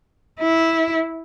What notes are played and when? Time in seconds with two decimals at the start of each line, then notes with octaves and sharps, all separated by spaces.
0.40 E4